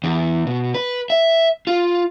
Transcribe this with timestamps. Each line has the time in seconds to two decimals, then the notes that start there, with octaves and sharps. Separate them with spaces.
0.04 E2
0.47 B2
0.74 B4
1.10 E5
1.67 F4